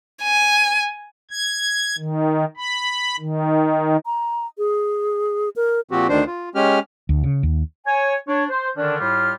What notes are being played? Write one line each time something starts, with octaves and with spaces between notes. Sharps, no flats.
G#5
G#6
D#3
B5
D#3
A#5
G#4
A#4
A#2 F3 C4 F#4 G4
D2 D#3 D4 C5
F4
G#3 C#4 G4 F6
D2
C#3
D#2
C#5 G#5
D4 C#5
C5
D3 D#3 C#4 D4
A2 G3 F4 G4 F6